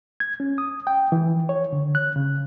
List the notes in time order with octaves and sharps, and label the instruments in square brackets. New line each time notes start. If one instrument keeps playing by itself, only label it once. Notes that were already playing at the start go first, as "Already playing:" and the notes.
[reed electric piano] G#6
C#4
D#6
G5
E3
C#5
D3
F#6
C#3